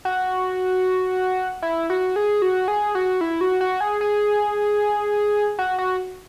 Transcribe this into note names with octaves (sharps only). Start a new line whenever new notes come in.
F#4
E4
F#4
G#4
F#4
G#4
F#4
E4
F#4
F#4
G#4
G#4
F#4
F#4